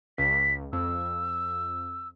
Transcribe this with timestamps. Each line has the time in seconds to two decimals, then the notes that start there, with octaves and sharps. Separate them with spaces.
0.18 C#2 B6
0.73 F2 E6